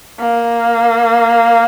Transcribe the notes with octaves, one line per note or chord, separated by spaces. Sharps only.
A#3